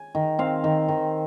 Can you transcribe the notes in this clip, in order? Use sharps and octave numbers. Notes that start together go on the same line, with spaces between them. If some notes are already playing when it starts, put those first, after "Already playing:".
Already playing: G#5
D#3
C4 F5
D#3
D#3